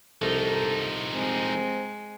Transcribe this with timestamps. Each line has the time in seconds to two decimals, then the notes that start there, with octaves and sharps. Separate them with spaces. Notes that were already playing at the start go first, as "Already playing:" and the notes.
0.22 C2 F3 D#4 A4
1.14 G#3 C4